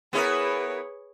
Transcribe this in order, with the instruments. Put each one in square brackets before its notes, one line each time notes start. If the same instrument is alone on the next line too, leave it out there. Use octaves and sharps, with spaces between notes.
[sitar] B3 E4 A#4 [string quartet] G#4 B4 C#5